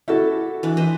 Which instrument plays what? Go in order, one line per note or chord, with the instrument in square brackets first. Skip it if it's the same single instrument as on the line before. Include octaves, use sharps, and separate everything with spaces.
[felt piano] E4 F#4 A4 [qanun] G4 A5
[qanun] E3 D4
B4 C5 D#5